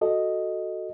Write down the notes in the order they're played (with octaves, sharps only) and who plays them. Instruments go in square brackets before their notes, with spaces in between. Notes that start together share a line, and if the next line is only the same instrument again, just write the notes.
[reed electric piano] F#4 A4 D#5